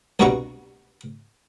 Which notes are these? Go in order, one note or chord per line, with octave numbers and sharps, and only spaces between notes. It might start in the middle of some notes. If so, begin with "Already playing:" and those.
C2 G2 B2 F#4 A#5 C#6